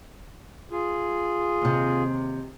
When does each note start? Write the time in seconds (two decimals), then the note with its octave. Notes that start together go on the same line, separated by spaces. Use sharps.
0.71 F4 G#4
1.62 D#2 C3